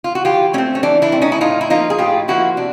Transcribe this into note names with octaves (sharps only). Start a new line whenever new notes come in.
F4
F#4
E3 F4 G4
A3 C4 C#4
C#4
E3 D4
D4 E4
A3 C4
C#4 D#4
E4
A2 D#4 F4
E4
F3 A#3 D#4 F4
G#4
A2 F4 G4
F3 A#3 E4 F#4
C3 D4